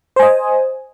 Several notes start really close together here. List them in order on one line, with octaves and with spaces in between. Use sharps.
C5 G#5 D#5